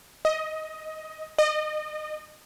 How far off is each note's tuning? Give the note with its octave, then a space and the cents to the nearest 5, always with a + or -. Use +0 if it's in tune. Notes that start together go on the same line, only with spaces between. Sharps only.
D#5 +15
D#5 -30